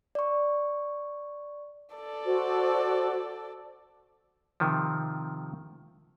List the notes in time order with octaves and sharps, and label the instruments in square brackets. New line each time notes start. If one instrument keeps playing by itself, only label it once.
[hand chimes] D5 C#6
[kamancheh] A4 D5
[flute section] F#4 C5
[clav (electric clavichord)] C3 D#3 F3